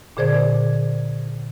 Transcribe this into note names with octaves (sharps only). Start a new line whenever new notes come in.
A#2 D3 G#4 C5 D5 G#6